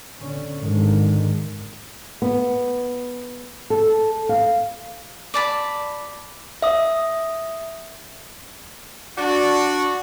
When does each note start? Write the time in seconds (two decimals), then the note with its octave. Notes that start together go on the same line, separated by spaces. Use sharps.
0.21 D3 C#4
0.60 G#2 D3 D#3 G#3
2.22 B3
3.70 A4
4.29 F5
5.34 D5 A5 B5
6.62 E5 D#6
9.17 D4 F#4